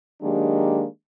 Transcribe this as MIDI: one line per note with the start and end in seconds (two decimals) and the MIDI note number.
0.22 0.85 51
0.22 0.85 54
0.22 0.85 56
0.22 0.85 58
0.22 0.85 62
0.22 0.85 67